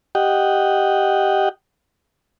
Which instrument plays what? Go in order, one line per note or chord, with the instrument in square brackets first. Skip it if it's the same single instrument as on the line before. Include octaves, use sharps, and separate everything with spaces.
[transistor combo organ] G4 D#5 F#5 G5